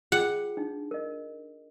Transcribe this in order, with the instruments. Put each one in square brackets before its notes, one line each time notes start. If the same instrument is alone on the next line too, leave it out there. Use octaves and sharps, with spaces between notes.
[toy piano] F4 G#4 G5 [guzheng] F#5
[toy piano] D4 D#4
A#4 D#5